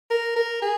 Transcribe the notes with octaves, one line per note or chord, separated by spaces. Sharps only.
A#4
A#4
G#4